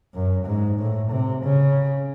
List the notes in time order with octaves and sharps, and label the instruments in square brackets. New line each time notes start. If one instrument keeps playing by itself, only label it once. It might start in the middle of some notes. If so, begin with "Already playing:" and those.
[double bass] F#2
G#2
A2
C3
C#3